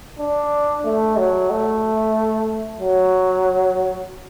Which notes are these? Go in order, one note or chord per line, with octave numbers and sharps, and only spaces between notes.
D4
A3
F#3
A3
F#3